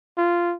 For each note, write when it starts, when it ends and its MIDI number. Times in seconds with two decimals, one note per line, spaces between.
0.18 0.55 65